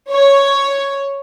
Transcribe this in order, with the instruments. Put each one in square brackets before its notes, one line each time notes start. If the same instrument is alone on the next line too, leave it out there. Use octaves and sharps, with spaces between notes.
[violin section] C#5